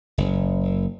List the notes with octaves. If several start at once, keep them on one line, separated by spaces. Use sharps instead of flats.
F#1